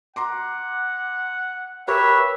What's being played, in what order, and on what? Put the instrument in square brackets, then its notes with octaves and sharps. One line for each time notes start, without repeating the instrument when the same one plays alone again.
[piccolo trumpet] F#5 [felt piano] A#5 C6 D6
[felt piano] G4 A#4 C#6 [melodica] B4 C#5 [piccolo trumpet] E5